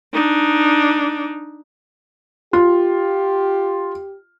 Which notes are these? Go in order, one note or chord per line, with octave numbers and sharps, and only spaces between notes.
D4 D#4
F4 G4